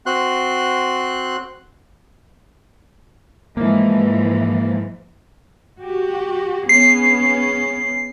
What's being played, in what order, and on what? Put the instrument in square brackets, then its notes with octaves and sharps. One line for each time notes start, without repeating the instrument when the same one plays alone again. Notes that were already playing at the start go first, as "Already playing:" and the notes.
[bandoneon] C4 F#4 C6 F#6
[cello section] G#2 E3 F3 [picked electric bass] A#3
[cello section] F#4 G4
[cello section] B3 C#4 G#4 [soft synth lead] C7